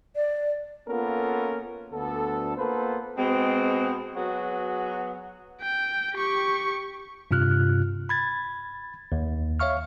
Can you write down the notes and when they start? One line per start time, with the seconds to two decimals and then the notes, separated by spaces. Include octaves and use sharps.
0.16 D5
0.89 A#3 B3 C#4 F4 A4 A#4
1.92 D2 B3 A4
2.57 A#3 B3 F4 A4 B4 C5
3.17 B2 G#3 C4
4.15 F#3 B3 F#4 G#4
5.61 G5
6.14 G4 C#6
7.31 G2 C3 F4 F6 F#6
8.09 B5 G#6 A6
9.12 D#2
9.60 C#5 E5 F5 C#6 F6